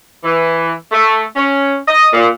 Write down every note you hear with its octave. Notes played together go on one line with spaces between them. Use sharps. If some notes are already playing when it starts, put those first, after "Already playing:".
E3
A3
C#4
D#5
A#2